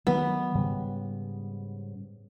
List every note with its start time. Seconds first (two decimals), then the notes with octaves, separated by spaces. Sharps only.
0.07 D#3 F#3 B3
0.55 G#2 C#3 G3